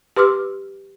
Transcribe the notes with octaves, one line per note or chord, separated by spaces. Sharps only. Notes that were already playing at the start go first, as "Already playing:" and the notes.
G4 B4 C6 D6 E6 F6